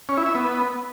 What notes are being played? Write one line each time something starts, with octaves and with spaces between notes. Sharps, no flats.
C#4
E4
E5
B3